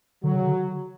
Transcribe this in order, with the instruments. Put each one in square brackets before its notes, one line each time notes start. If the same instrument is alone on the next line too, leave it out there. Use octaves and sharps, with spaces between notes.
[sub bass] D3 [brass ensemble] F#3
[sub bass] C#3
D3